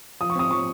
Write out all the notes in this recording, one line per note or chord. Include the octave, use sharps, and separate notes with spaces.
F3 D#6
C#6
C4 D#6
F3 C#6